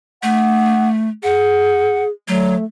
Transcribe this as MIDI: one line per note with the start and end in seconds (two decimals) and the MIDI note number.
0.23 1.09 57
0.23 0.89 78
1.23 2.09 68
1.23 2.04 78
2.28 2.55 54
2.28 2.64 57